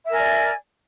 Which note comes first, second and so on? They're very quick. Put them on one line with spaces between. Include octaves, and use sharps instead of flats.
E5 A#4 G#5 D5